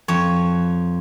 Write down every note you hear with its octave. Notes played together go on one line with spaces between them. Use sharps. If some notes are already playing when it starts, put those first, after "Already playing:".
F2 C#5